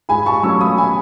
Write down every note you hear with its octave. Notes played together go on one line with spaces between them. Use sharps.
G#2 G#5 B5
A5 C#6
F#3 A3 C#4 C#6 E6
B5 D#6
G#5 B5